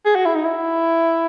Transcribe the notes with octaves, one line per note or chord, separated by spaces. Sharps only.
G#4
F#4
E4
D#4
E4